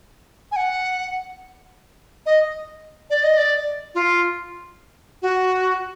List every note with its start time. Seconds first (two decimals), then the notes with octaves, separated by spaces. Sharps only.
0.52 G#5
0.56 F#5
2.26 D#5
3.10 D5
3.23 D#5
3.37 D5
3.95 F4
5.22 F#4